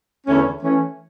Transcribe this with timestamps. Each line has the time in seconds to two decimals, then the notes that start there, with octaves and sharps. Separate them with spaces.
0.26 E2 D3 A3 C#4
0.62 E3 A3 C#4